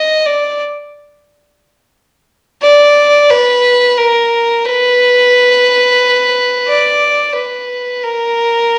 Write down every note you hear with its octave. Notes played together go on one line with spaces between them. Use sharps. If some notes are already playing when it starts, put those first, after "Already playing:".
Already playing: D#5
D5
D5
B4
A#4
B4
D5
B4
A#4